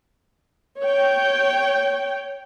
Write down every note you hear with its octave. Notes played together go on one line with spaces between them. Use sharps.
C#5 G5